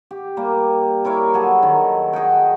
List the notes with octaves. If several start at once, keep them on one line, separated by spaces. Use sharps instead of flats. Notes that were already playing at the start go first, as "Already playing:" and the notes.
G4
G3 A#3
E4 A#4 C#5 D5
F#3 G#4 A4
D#3
G#4 D#5 F#5 G5